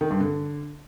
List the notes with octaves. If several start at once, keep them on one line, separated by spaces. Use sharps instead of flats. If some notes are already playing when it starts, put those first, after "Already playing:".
D#3
G2
D3